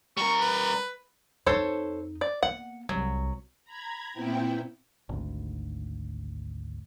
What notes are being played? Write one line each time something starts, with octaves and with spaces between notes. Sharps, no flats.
G3 A#4 C#6
B4
F2 D#4 A4 C5 C#5
D5
A#3 B3 F#5
C2 F#3
A#5 B5 G#6
A#2 B3 C4 E4 G5
G#1 D2